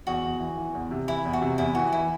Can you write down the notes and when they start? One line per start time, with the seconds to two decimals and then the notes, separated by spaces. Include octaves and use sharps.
0.07 E2 F#4
0.24 E2
0.40 E3
0.58 E3
0.75 E2
0.91 C3
1.07 E3 E4
1.25 E2
1.33 F#4
1.42 C3
1.58 E2 E4
1.75 E3 F#4
1.92 E3 E4